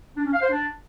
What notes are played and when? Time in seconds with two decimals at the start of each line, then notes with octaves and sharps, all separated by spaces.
0.16 D4
0.25 C#4
0.33 F5
0.41 C5
0.50 D4